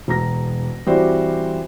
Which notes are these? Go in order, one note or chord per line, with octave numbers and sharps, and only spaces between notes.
E1 A#5 A#6
E3 G3 C4 F#4 C5 D5